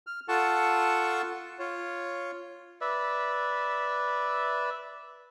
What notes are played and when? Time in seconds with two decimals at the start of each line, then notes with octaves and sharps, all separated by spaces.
0.07 F6
0.28 F4 A4 F#5 A5 C#6
1.59 F4 C#5
2.81 B4 D5 E5